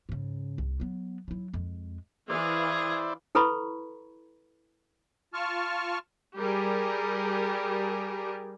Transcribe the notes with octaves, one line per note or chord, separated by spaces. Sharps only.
G#2 C#3
C2
F#3 B3
F#3 E4
F2 G#3
E3 E4 G#4 C5 D5 F5
E4 A4 B4 A#5 B5 C#6
F4 A5 C#6 F6
G3 G4 G#4 A#4